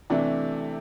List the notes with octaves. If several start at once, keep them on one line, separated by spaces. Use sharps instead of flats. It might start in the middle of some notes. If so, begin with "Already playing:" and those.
C3 E3 A3 D4